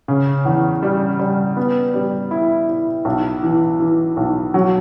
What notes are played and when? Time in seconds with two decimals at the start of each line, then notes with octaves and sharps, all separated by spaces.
0.08 C#3
0.45 E2
0.83 G3
1.20 G3
1.57 B3
1.94 G3
2.31 E4
2.68 E4
3.05 B1
3.43 E3
3.80 E3
4.17 B1
4.54 F#3